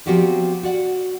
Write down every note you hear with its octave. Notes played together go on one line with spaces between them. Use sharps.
F3 B3 C4 F#4 G4 D5
F#4 D5 F#5